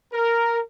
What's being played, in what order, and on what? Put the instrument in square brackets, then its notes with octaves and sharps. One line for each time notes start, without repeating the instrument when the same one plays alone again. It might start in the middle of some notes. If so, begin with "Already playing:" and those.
[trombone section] A#4